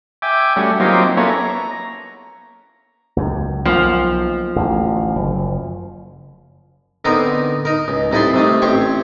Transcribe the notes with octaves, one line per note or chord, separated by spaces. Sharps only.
E5 G5 G#5 D6
G3 A3 C#4 F#4
F#3 A#3 C4 D#4 F4 G4
A#3 B3 C#4 E4 A4 C#5
A#5
C#2 F#2
B1 F3 A#3
A1 D2
F#1
D3 B3 C4 D#4 A#4
D#4 A#4
C#2
C2 D#4 E4 A4 E5 C6
C3 D#3 A3
A1 C4 G4 C#5 C#6